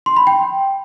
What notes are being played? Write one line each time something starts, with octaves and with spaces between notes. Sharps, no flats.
C6
B5
G5